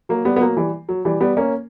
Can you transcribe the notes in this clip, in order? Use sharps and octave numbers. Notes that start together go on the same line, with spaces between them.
F#3 A#3
G3 B3
B3
F#3 A#3
E3 G3
F#3
E3 G3
G3 B3
A#3 C#4